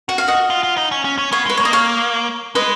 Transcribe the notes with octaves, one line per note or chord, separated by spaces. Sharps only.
F#4 F#5
F5
D#5 F#5
F4
F4
D#4
C#4
C#4
C#4
B3 C#5 F5
G#3 B4
A#3 C#5
D#5
C#5 F5
G#3 B4 D#5